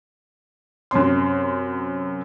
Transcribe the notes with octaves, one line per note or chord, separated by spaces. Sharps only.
F#2 C3 C#4 C6